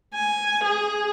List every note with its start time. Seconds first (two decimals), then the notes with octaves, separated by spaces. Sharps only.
0.14 G#5
0.64 G#4